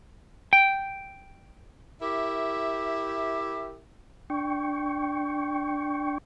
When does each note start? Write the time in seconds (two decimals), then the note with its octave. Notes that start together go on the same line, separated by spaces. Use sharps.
0.53 G5
2.00 E4 G4 A#4 E5
4.30 D4 G5 C#6